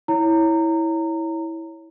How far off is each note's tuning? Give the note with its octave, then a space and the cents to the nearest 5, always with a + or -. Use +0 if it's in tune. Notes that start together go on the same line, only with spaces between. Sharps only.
E4 -10 C#5 +5 A#5 -20